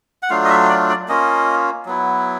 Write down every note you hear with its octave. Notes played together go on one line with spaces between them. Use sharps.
F#5
F#3 A3 D4 F4 F5
D#5
E5
D5
D5
A#3 C#4 F4 D#5
F#3 B3 E4